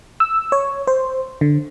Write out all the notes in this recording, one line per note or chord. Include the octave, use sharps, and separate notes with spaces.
E6
C#5
C5
D3